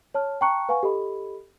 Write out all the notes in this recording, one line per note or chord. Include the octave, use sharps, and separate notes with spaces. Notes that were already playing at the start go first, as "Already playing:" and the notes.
C#5 A5 F6
G5 A5 A#5 C#6 F#6 C#7
B4 F5 F#5 G#5 C#6
G4 A4 D#5 B5